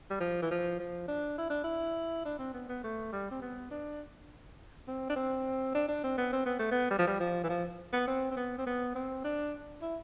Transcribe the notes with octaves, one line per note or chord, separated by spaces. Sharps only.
G3
F3
E3
F3
F3
D4
E4
D4
E4
D4
C4
B3
B3
A3
G3
C4
B3
D4
C4
D4
C4
D4
D4
C4
B3
C4
B3
A3
B3
G3
F3
G3
F3
E3
F3
B3
C4
C4
B3
C4
B3
C4
D4
E4